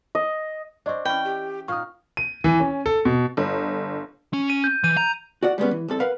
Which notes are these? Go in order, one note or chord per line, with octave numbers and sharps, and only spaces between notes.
D#5
C4 D4 D5 D#5 C#6
E3 C#4 G5 B5
G4
A#2 D#4 C#6 D#6 F6
D#7
E3
C#4
A4
B2
G1
C#4
D#7
G6
E3 G6 D#7
A#5
F#4 D5 F#5
G3 G#3 B3 C#4
E3
C2 C3 A4
A#4 B4 F5 F#5